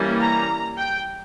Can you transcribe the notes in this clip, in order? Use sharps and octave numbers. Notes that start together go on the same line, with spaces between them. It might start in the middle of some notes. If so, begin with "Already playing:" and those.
Already playing: E3 G3 A#3 C#4
A#5
G5